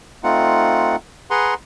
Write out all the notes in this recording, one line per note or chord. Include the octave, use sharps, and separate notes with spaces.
A3 C4 D#4 F4 F#5
G#4 B4 F#5 A#5 C6